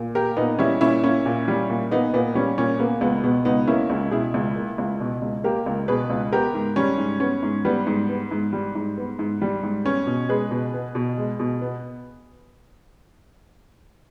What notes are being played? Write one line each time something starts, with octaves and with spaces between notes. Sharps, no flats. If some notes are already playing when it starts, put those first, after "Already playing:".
Already playing: A#2
A#3 G4 A#4
A#2 B3 D#4
G3 C#4 E4
A#2 C#4 E4
A#3 C#4 E4
A#2
G3
A#2
A#3 B3 D#4
A#2 B3
G3 C#4
A#2 C#4
A#3 B3
C#2 B3
B2 B3
C#2 B3 D#4
A#3 C#4 E4
C#2
B2 E4 G#4
C#2
A#3
C#2
B2
C#2
A#3 G4 A#4
C#2
B2 G#4 B4
C#2
B3 G4 A#4
G#2
G3 C#4
G#2
B3 C#4
G#2
G3 B3
G#2
B3
G#2
G3
G#2
B3
G#2
G3
G#2
B3 C#4
B2
G#3 G#4 B4
B2
B3
B2
G#3
B2
B3